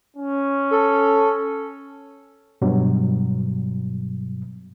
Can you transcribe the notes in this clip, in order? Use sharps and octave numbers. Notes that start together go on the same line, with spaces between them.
C#4
A4
G2 B2 F#3